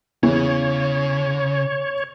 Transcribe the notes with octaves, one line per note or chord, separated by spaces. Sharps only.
E2 C#3 E3 C#5